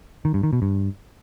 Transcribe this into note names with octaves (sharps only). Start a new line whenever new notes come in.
D#3
G2
D#3
B2
G2